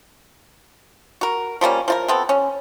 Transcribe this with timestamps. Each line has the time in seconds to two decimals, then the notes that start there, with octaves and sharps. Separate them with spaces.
1.21 F#4 A#4
1.61 F3 G3 A#3 C#4
1.88 F3 F4 A#4
2.08 B3 C4 A4
2.29 C#4